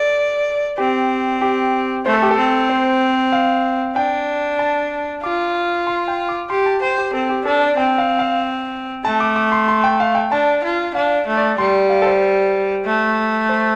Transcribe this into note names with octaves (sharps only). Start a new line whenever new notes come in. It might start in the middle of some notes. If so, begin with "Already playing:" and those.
Already playing: A4 D5
C4 G4
G4
A3 C5
A4
G4
A4
C4
C5
F5
D4 G5
A5
F4 D6
C6
G5
D6
G4 C6
A5
C5 G5
G4
C4 A4
G4
D4 A4
D5
C4 G5
F5
F5
A3 A5
D6
D6
C6
C6
G5
F5
G5
D4 A5
F4
D4 F5
A3
D5
G3 C6
F5
A4
C5
A3
C5